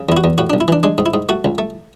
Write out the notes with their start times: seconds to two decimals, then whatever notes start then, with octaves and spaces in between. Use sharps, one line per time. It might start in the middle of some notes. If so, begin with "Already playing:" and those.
Already playing: C#3
0.09 E2 E4
0.17 F#4
0.24 E2
0.38 A2 F#4
0.50 D4
0.53 B1
0.61 E4
0.68 E3 D4
0.83 G#3 D4
0.98 G#2
1.06 E4
1.14 G#2
1.29 A3 F#4
1.45 C#2
1.58 A3